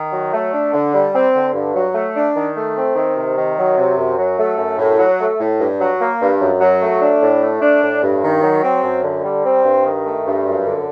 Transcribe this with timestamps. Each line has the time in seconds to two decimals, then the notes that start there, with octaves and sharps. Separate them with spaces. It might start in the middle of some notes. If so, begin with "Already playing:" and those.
Already playing: D#3
0.12 F#3
0.33 A3
0.53 D4
0.73 D3
0.93 G3
1.14 C4
1.34 D3
1.54 G2
1.74 F#3
1.94 A3
2.15 D4
2.36 D#3
2.56 A3
2.76 C4
2.96 D#3
3.16 C3
3.36 D#3
3.57 F#3
3.77 C3
3.98 F#2
4.17 F#3
4.38 A3
4.58 F#2
4.78 A2
4.98 F#3
5.19 A3
5.39 A2
5.60 G2
5.80 F#3
6.00 A#3
6.20 G2
6.40 F#2
6.60 F#3
6.80 A3
7.01 D4
7.22 A2
7.42 A3
7.61 D4
7.82 A2
8.02 G2
8.22 D#3
8.42 F#3
8.62 C4
8.83 F#2
9.03 D3
9.24 G3
9.44 C4
9.64 G2
9.84 D#3
10.05 A3
10.25 G2
10.45 F#2
10.65 D3